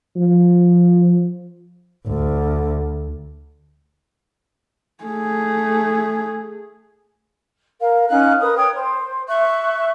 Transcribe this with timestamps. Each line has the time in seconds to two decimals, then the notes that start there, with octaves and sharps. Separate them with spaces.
0.16 F3
2.07 D2
5.04 A3 G#4
7.81 A#4 F5
8.09 C#4 D#4 F5 F#6
8.41 A#4 B4 D#6
8.57 C#5 G5 D#6 G#6
8.74 C5
9.27 E5 C#6 F#6